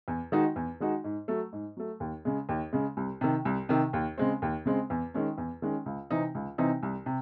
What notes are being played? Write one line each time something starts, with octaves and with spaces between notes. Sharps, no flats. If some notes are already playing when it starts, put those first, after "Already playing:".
E2
D#3 G#3 D#4 F#4
E2
D#3 G#3 D#4 F#4
G#2
F#3 A3
G#2
F#3 A3
D#2
C#3 G#3
D#2
C#3 G#3
C2
C3 D#3
C2
C3 D#3
D#2
C#3 G#3 C4
D#2
C#3 G#3 C4
E2
D#3 G#3 C#4
E2
D#3 G#3 C#4
C#2
C3 E3 C4 D#4
C#2
C3 E3 C4 D#4
C2
C3